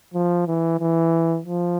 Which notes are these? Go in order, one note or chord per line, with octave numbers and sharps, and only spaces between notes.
F3
E3
E3
F3